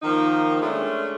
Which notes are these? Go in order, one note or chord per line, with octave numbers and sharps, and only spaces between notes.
D#3 F3 A#3 D#4
G#3 A3 C#4 D4